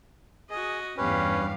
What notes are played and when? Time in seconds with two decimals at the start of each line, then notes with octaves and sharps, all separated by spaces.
0.50 F#4 G#4 D#5
0.97 E2 G2 C#4 G4 B4 F5